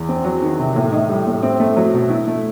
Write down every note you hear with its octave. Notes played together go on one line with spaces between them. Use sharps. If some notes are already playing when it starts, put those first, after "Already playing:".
Already playing: E2
C4
F#3
D#3
C3
A2
D#4
G3
A2
C4
A3
F#3
B2
E4
A3